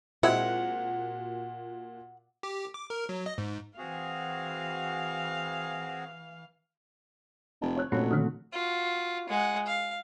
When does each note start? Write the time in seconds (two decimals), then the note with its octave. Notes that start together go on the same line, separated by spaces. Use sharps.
0.23 A#2 G#3 C4 E4 F#4 F#5
2.43 G4
2.74 D6
2.90 A#4
3.09 F#3
3.26 D#5
3.38 G#2
3.78 E3 C4 F#4 G#4 F5
7.61 F1
7.77 C#5 F#6
7.92 F1 A#2 A3 C#4 F#4
8.11 D3 D#3 F3 C4
8.53 F4 F#4
9.29 G#3 F#5
9.67 F5